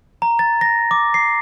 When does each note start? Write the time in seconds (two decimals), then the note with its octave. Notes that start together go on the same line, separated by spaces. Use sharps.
0.22 A#5
0.39 A6
0.61 A#6
0.91 D6
1.14 C7